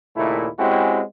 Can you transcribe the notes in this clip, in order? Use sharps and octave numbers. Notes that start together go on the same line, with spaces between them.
D#2 A#2 C#3 A3 E4
G#3 C4 C#4 E4 F#4 G4